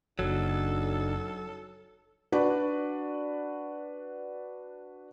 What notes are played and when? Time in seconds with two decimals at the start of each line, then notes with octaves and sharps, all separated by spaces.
0.19 F#1 C#3 F#3 D4 D#4 A4
2.32 D4 F#4 B4 D5